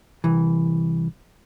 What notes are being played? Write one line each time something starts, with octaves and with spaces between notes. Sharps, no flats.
C2 E3